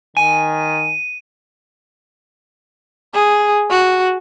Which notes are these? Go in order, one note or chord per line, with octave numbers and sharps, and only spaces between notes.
D#3 G#5 D#7
G#4
F#4